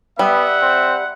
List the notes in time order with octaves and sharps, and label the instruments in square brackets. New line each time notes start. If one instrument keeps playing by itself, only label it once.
[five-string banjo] G3 [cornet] B3 [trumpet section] E5 F#5
[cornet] C4